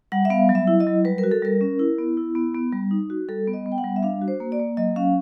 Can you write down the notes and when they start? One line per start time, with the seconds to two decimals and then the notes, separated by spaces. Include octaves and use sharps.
0.12 G3 F#5
0.25 E5
0.30 B3 F5
0.49 F#3
0.55 E5
0.67 E4
0.80 D#5
0.87 F#3
1.05 G3 B4
1.18 A#4
1.23 F#4
1.31 A4
1.42 G3 A#4
1.61 C#4
1.79 E4
1.98 B3
2.17 E4
2.35 B3
2.55 B3
2.72 G3
2.91 D#4
3.10 F#4
3.29 G3 A4
3.47 B3
3.53 D#5
3.66 B3
3.72 G5
3.78 F#5
3.84 G3
3.96 E5
4.03 D4 F5
4.22 F#4
4.28 C5
4.40 A#3
4.52 D5
4.60 A#3
4.77 F#3 D#5
4.96 C#4 F5